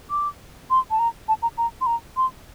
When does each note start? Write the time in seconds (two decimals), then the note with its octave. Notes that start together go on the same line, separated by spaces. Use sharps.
0.11 D6
0.70 C6
0.91 A5
0.99 A#5
1.28 A5
1.42 A#5
1.58 A#5
1.81 C6
1.86 A#5
2.17 C6